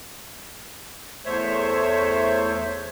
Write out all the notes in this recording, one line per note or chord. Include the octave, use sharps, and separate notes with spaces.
E2 A3 C5 C#5 E5